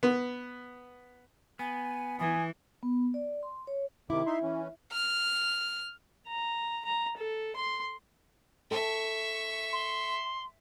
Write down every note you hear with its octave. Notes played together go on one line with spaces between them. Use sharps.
B3
B3 G#5
E3 G#5 D#6
B3
D5
C6
C#5
C3 D#3 E4 D6
D#4 E5 C6
E3 C#4
F6
A#5
A#5
A4
C6
A4 E5 G5 A5 C#6
C6